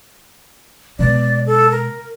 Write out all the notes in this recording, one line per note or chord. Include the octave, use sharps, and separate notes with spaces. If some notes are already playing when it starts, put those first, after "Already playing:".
B2 G#3 D5
A4
A#4